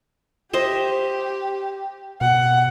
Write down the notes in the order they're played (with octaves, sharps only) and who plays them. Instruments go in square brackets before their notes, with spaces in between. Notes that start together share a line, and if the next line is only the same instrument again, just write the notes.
[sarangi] G4 [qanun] C5 D#5 E5
[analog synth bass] B2 [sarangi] F#5